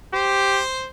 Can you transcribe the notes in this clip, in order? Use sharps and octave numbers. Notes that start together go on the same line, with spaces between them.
G4 C5